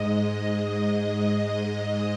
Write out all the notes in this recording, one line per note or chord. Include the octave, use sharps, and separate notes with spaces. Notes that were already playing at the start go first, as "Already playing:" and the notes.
Already playing: G#2 G#3 D#5
D#5